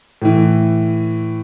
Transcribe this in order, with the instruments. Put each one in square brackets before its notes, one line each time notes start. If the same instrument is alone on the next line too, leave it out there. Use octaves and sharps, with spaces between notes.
[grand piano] A2 E3